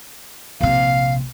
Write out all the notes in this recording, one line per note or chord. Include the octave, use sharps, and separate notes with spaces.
A#1 C3 F5